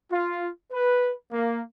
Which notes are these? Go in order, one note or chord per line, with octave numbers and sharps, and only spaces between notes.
F4
B4
A#3